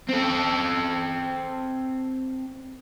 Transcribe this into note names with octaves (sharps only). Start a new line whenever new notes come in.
C4 A4